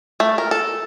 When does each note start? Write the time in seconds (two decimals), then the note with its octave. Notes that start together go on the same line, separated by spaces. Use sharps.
0.20 A3
0.38 A#4
0.51 A4